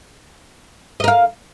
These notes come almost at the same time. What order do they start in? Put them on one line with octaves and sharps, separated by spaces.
D#5 A#4 F5